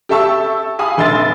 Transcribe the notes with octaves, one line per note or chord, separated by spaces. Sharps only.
G4 A4 E5 A5 C#6 E6
F5 G#5 B5 D#6
F1 A#1 C6 E6 A6